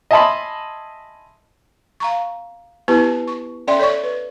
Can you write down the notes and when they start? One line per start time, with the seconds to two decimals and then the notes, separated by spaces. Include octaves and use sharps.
0.11 D#5 E5 G#5 A5 B5 C6
2.00 F5 A#5 C#6
2.88 B3 E4 G4 B4 A5
3.27 C#6
3.67 C#4 A4 D5 E5 G5 C6
3.79 A4 C#5 D5 C#6
4.03 B4